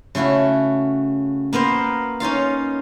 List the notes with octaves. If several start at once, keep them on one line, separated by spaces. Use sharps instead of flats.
C#3 A3 E4 F#4
A#3 B3 A#4 C5
C#4 D#4 F4 F5